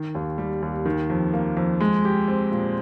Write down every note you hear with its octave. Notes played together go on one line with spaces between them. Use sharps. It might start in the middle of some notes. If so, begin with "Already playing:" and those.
Already playing: D#3
D#2
G3
D#2
D#3
F2
A#3
F2
G#3
G4
C4
A#2